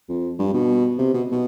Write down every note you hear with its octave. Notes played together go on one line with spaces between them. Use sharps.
F2
G2
B2
C3
B2
B2